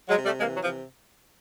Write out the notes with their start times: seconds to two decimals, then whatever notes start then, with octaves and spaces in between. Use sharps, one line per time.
0.08 F#3 G#3
0.16 C3
0.24 G3 A3
0.40 E3 G#3 A#3
0.52 F#3
0.63 C3 F3